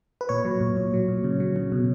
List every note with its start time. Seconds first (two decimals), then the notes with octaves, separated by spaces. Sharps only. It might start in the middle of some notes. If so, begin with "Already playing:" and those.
0.21 B4
0.29 A#2 C#5
0.45 F#3
0.61 A#2
0.77 A#2
0.94 F#3
1.08 A#2
1.24 C#3
1.40 F#3
1.56 C#3
1.72 B2